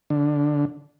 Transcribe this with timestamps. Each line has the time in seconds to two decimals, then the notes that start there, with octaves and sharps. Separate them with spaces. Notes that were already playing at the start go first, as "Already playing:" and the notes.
0.10 D3